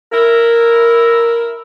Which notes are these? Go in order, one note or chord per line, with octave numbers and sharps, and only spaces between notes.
E4 A#4